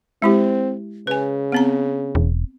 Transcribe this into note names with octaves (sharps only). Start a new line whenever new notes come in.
G#3 C4 E4 G4
C#3 B4 G#5
B3 C4 A#5
E1